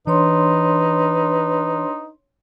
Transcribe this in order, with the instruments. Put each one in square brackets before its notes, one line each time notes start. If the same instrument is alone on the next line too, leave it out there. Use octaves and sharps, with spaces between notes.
[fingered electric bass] E3 [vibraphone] D4 C#5 C6 [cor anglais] D#4 [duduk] B4